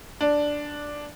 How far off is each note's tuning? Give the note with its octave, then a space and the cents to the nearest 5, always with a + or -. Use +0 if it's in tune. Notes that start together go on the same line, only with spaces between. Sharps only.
D4 +0